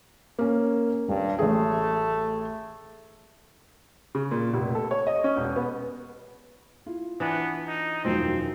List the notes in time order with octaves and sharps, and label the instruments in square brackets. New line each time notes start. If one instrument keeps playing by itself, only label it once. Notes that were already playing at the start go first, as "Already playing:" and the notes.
[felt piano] A#3 C#4
[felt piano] D#1 [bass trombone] G2
[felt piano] A1 G#4 [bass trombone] A3
[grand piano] C#3
A#2
F1
A4
C#5
D#5
C#4
E1
B3
[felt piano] E4 F4
[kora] E3 D4 D5 [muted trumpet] B3
[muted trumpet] D#4
[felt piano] E1 F#2 D#3 [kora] F3 [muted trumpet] C4